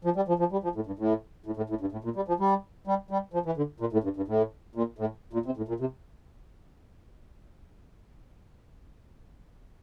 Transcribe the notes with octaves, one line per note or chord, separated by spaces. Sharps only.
F3
G3
F3
F3
G3
F3
A2
G2
A2
A2
A2
A2
G2
A2
A#2
G3
F3
G3
G3
G3
F3
E3
D3
A#2
A2
G2
G2
A2
A#2
A2
A#2
C3
A2
A#2
C3